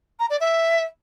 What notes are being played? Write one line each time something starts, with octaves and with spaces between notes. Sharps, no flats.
A#5
D5
E5